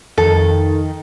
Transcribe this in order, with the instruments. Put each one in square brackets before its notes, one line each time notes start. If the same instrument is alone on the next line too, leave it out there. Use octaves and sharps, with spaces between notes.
[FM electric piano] F2 [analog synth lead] D#3 [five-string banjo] A4